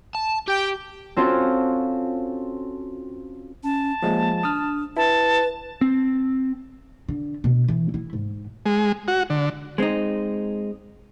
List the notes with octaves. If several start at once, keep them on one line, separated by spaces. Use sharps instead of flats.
A5
G4 G5
C4 C#4 F4 F#4 A4 C5
C#4 A5
F3 G#3 A#3
D4 D#6 F6
E4 B4 A5
C4
D3
B2
E3
E4
G#2
G#3
F#4
D3
G#3 C4 C#4 D#4